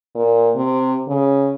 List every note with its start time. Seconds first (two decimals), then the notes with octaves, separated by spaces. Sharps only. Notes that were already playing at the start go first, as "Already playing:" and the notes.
0.15 A#2
0.56 C3
1.08 C#3